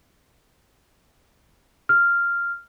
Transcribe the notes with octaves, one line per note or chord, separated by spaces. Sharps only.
F6